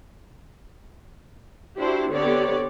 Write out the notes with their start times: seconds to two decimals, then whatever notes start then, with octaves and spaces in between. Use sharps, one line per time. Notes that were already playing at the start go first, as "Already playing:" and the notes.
1.78 D4 E4 F#4 G4 C5
2.11 D3 B3 C4 G4 C#5 D5